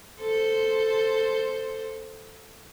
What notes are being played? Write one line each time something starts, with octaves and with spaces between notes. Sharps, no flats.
A4 C5